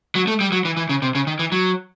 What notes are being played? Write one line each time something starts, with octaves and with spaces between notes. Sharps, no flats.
F#3
A3
G3
F#3
E3
E3
C#3
C3
C#3
D#3
E3
F#3